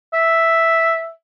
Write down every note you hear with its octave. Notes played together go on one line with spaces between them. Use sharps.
E5